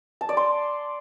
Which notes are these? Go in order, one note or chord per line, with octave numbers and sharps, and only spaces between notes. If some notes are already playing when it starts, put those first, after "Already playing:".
A5
D5
C6